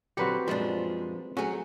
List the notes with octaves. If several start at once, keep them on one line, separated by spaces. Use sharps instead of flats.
A#2 D3 F#3 C4 F#4 G4 B4 C#7
F#2 A#2 F3 G#3 D4
F#3 A3 C#4 F#4 G#4